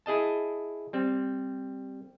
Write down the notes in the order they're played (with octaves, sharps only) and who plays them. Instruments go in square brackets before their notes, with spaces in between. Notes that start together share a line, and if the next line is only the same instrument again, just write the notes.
[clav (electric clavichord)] E4 G#4 D#5 A5
G3 C4